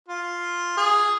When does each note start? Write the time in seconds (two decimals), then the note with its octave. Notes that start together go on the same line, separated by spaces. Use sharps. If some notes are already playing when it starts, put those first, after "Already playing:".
0.09 F4
0.77 G#4